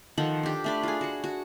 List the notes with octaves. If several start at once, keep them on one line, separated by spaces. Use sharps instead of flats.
D#3 F3 A4 F#5
D4 G4
A3 D4 B5
F4 G#4
F#4 F#5
F#4